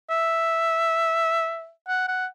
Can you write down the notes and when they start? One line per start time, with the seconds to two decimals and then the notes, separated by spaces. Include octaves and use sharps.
0.10 E5
1.88 F#5
2.08 F#5